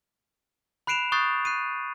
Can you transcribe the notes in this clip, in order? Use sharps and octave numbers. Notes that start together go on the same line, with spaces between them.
B5 F#6 C7 D7 E7 F7
C#6 D#6 F#6 G6 A6 C7
F#6 C7 D#7